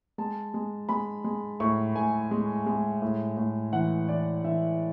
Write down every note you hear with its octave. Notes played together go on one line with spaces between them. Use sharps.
G#3 A5
G#3
G#3 B5
G#3
A2 C#6
A2 G#5
G#3
G#3
A2
A2
E3 F#5
E3 D5
E3 E5